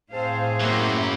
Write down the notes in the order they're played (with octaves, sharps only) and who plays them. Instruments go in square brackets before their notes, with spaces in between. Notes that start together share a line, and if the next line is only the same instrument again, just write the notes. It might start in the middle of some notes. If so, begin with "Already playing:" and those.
[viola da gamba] A2 G#4 [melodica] C4 A5 [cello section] C5 F5
[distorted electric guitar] F#2 F#3 [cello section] A#3 [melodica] E4 G4 C6